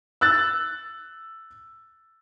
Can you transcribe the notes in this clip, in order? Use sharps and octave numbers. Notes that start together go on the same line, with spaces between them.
E6 F#6 A6